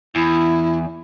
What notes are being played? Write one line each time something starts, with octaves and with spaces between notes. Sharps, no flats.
E2 E4